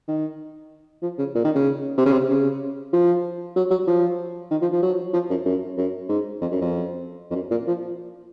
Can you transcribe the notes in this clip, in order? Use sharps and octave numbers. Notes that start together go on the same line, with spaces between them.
D#3
F3
C#3
A#2
D#3
C#3
C3
C#3
C3
C#3
F3
F#3
F#3
F3
D#3
F3
F3
F#3
F3
F#2
F#2
F#2
G#2
F2
F#2
F2
F2
F#2
A#2
F3